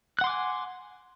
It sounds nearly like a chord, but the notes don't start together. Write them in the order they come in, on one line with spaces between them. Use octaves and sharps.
F#6 F#5 C6 D6 G#5